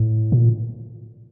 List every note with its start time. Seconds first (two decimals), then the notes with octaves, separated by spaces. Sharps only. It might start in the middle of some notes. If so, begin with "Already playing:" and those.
Already playing: A2
0.32 A#2